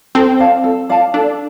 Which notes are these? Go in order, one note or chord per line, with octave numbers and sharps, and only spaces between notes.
C4 A4
D5 F5 A5
A4
D5 F5 A5
D4 A4